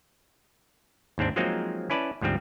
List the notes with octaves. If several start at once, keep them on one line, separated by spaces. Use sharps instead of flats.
D#2 G#2 C4 D4
F3 F#3 G#3 A#3 C4 D#4
C#4 E4 B4 D5 A5
D2 G#2 F3 G3 C4